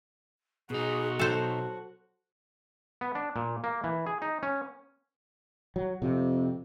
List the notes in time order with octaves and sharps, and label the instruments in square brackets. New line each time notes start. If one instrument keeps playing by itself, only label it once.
[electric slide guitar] B2 D#4 [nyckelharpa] F#4 [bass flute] G#4
[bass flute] F#3 [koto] A4 C5
[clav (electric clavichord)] B3
D4
A#2
A#3
E3
G#4
D#4
C#4
[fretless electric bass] F#3
[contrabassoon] F2 [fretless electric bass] C3